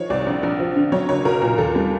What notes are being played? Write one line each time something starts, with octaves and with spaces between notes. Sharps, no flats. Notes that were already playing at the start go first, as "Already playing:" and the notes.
Already playing: D#3 F3 C#5
C2 D5
A#1
A#1
F3
D3
F#3 C#5
F#1 C#5
B1 A#4
A#2
D#2 A4
G3